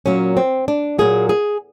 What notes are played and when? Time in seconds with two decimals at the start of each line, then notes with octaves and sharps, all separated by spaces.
0.06 A#2 F#3 A#3 C#4
0.37 C4
0.68 D4
0.98 A#2 F#3 A#3 G#4
1.29 G#4